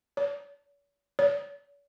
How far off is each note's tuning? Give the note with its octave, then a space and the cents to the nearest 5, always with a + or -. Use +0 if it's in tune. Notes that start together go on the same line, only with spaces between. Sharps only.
C#5 +45
C#5 +45